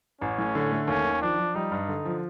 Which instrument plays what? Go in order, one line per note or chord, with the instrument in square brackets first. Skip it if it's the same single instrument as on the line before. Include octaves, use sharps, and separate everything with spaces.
[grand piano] A1 [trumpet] C#4
[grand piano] A2
D3
A3
[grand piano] D#2 [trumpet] C#4
[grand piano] D#3
[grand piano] F3 [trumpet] D4
[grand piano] F3
[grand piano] G3 [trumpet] D#4
[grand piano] G2
D3
F3